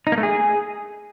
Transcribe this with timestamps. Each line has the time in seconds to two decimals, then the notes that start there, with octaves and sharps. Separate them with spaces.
0.07 D#4
0.12 A#3
0.18 A3
0.23 G#4